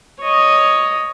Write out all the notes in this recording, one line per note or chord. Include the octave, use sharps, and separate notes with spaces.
C#5 D#5